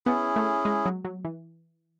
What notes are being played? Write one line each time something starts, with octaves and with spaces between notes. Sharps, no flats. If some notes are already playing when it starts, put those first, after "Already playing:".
B3 C#4 E4 G#4
A3
G#3
F#3
F#3
E3